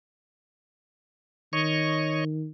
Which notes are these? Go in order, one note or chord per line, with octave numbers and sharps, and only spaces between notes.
D#3 C#5 D#5 C#6